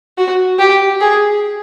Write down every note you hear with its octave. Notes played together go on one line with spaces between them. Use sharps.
F#4
G4
G#4